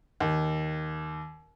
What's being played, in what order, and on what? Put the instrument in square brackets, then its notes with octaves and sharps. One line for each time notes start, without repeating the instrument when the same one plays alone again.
[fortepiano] D#2